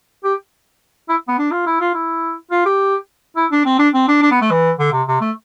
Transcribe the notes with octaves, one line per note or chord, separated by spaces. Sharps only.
G4
E4
B3
D4
F4
E4
F4
E4
F4
G4
E4
D4
C4
D4
C4
D4
D4
B3
A3
E3
D3
C3
C3
A3